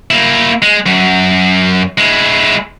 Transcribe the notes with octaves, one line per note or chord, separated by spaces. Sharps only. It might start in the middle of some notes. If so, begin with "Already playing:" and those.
A#3 E4
G#3
F#2
G#3 E4